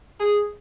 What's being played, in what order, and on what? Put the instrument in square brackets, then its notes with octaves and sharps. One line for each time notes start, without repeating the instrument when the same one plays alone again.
[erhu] G#4